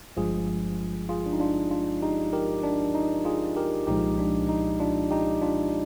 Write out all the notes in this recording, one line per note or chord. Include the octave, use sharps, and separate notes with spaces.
G1 G2 F3 G#3 F4 G#4
F4 G#4
D4
D#4
D4 F4
D4 F4
D#4 G4
G4 A#4
D4
D#4
F4 G#4
G4 A#4
C2 A#2 F3 G#3 D#4 G4
D4
D#4
D4 F4
D#4 G4
D4 F4